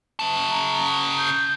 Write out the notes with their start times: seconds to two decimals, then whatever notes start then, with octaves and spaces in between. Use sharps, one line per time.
0.19 C#3 A5
0.49 A#5
1.18 G6